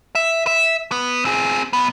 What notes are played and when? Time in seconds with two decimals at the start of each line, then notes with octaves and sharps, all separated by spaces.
0.15 E5
0.47 E5
0.92 B3
1.25 C4 G#4
1.73 B1 B3